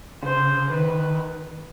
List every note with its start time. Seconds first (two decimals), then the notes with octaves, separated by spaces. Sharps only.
0.23 C#3 C5
0.70 D#3 B4